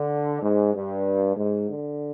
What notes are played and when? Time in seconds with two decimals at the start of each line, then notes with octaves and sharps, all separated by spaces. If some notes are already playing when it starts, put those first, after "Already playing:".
Already playing: D3
0.42 G#2
0.74 G2
1.37 G#2
1.69 D3